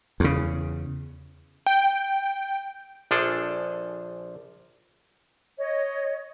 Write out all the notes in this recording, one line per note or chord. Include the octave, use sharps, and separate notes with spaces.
E2 C#3
G5
A#1 F3 D4 G#4 A4
C#5 D#5